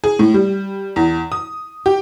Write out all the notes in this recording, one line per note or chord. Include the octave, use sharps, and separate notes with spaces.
G#4
A2
G3
E2
D#6
G4